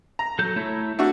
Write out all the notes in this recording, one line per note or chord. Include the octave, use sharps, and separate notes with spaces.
A#5
F#3 A4 G6
A3 E4 C#5
A3 D4 F#4